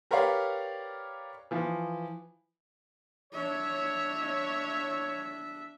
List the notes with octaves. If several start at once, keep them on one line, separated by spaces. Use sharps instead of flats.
G4 A#4 B4 C#5 D5 F5
E3 F3
D4 C#5 E5